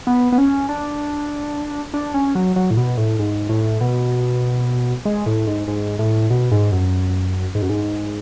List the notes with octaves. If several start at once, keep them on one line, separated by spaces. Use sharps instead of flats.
B3
B3
C#4
D4
D4
C#4
F#3
F#3
A2
B2
A2
G#2
A2
B2
G#3
A2
G#2
G#2
A2
B2
G#2
F#2
G#2
F#2
G#2